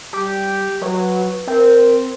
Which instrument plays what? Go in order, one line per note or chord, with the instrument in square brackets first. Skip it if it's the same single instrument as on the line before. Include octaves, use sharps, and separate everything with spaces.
[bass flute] G3 [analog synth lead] G4
[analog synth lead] F#3 [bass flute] B4
[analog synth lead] C4 [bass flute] A#4